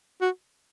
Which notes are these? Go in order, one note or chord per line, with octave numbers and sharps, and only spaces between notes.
F#4